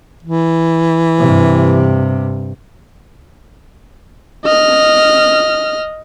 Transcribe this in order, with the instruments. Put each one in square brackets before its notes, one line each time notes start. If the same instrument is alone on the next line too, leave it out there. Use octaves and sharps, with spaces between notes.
[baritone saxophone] E3
[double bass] G2 C3
[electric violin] D#5 F6